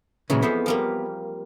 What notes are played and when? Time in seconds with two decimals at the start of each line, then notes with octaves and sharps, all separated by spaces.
0.30 A#2 C#3 E3 F#3 G#3
0.42 F2 E3 B3 C5
0.66 F3 G3 A#3